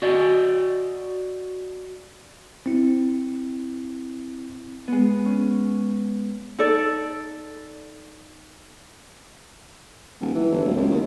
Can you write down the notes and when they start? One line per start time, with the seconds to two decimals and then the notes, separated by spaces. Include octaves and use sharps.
0.02 F#4 D5 D#5
2.66 C4 E4
4.88 G#3 B3
5.25 C#4
6.59 D#4 A4 D5
10.21 D#1
10.35 E3
10.52 G1
10.65 D1
10.77 C#2
10.91 D#2